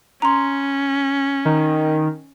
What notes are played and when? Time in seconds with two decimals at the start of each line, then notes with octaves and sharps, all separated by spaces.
0.22 C#4 A#5 C6
1.45 D#3